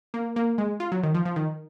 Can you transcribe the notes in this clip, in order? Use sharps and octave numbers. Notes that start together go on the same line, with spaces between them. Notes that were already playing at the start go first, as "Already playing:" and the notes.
A#3
A#3
G#3
F4
F#3
D#3
F3
F3
D#3